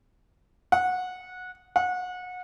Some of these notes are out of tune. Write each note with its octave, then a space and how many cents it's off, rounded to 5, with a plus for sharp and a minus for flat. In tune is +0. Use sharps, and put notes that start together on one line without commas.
F#5 -15
F#5 -25